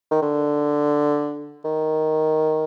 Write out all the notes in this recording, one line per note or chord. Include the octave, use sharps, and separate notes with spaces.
D#3
D3
D#3